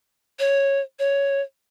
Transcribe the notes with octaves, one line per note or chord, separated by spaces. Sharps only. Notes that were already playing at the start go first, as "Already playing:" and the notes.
C#5
C#5